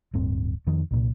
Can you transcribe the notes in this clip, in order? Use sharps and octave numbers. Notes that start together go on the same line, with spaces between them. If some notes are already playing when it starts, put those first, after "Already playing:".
D1 G2 C4
F2 D#3
C2 A#2